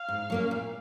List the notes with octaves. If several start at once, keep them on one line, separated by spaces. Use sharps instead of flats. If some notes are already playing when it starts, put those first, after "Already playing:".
Already playing: F5
G#2
F#3 A#3 C#4
A#2